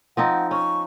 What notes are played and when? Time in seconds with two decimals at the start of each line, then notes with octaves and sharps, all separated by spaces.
0.17 F3 C4 D#4 F#5
0.51 C#4 C#6